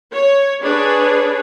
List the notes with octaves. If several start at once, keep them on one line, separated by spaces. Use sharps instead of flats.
C#5
D4 G#4 B4 C#5